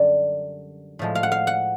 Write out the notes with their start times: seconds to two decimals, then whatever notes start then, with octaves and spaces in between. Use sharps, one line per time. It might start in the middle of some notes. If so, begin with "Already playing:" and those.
Already playing: F#2 D3 G3 D5
0.99 A2 F3 G#3
1.15 F5
1.23 F#5
1.32 F5
1.47 F#5